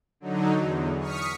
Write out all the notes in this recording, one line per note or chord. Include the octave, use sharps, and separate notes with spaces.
D3 F#3 D#4
E2
C#6 D#6 F6 B6 C#7